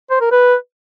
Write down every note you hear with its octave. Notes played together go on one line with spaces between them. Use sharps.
C5
A#4
B4